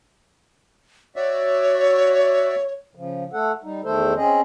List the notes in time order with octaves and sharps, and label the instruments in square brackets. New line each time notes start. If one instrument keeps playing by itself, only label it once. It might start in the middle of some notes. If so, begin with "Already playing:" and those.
[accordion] F#4 D5 E5 [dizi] C#5
[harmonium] C#3 F3
A3 A4 F#5
G3 D#4
E2 D#3 A3 A4 C5
C4 C#4 G#4 D#5